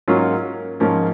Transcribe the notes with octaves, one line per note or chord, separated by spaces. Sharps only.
G#2 F#3 A#3 C#4 F4
G#2 F3 A#3 C#4